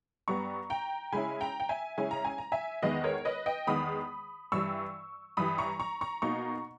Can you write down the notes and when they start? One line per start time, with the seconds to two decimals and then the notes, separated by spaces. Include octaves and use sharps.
0.28 G2 G3 B3 A#5 C#6
0.70 G5 A#5
1.12 C#3 G#3 C#4 E4 G#5 B5
1.41 G5 A#5
1.60 G5
1.69 E5 G#5
1.98 C#3 G#3 C#4 E4 G#5
2.11 A#5
2.25 G#5
2.38 A#5
2.52 E5 G#5
2.82 E2 D#3 G#3 B3 B4 D#5
3.04 A#4 C#5
3.25 B4 D#5
3.46 D#5 G5
3.67 E2 D#3 G#3 B3 B5 D#6
4.52 G2 E3 G3 C#6 E6
5.37 G2 E3 G3 B5 D#6
5.58 A#5 C#6
5.80 A#5 C#6
6.01 A#5 C#6
6.22 B2 A#3 D#4 A#5 C#6